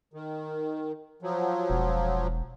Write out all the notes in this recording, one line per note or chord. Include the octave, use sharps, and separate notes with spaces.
D#3
F3 F#3
E1